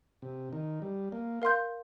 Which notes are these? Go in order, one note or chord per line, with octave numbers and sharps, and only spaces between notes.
C3
D#3
G3
A#3
A#4 F5 C6 G6